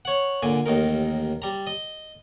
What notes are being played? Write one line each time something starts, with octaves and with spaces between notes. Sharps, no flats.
C#5 F#5
A#2 D3 G#5
A1 D#2 D#4 A#4
G3 A#5
D#5